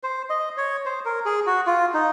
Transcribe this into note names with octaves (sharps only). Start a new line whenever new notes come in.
C5
D#5
C#5
C5
A#4
G#4
F#4
F4
D#4